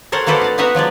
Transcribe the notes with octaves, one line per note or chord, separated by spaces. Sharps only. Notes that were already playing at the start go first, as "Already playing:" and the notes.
A4 A#4 C5 C#5 F#5
A#3 F#4 A4 B4 C5 D5
D#4 D5
B3 D#4 F#4 B4 E5 A#5
F3 F#3 G#3 D5